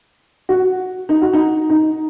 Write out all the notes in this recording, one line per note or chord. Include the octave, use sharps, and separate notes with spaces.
F#4
D#4
F#4
D#4
D#4